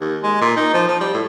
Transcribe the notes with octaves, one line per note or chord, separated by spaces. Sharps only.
D#2
G#3
A#2
D#4
F3
F3
G3
A2